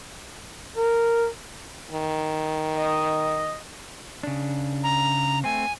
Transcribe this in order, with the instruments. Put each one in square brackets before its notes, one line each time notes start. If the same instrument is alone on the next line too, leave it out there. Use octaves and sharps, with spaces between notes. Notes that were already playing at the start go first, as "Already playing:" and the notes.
[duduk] A#4
[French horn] D#3
[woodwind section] D#5
[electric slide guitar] C#3 D4
[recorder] A#5
[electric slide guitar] A3 C4 [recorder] G#5